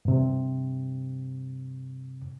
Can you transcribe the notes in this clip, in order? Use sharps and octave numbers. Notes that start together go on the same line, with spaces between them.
G2 C3